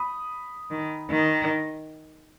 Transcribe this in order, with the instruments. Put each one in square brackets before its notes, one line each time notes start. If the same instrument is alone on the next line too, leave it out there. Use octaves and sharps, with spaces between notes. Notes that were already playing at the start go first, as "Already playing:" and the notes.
Already playing: [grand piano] B5 D#6
[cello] D#3
D#3